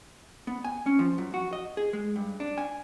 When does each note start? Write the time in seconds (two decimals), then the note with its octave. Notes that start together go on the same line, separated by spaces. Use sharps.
0.47 B3
0.65 G#5
0.86 C#4
0.99 F3
1.18 F#2
1.34 F#4
1.53 D#5
1.77 G#4
1.93 G#3
2.16 G2
2.40 D4
2.58 G#5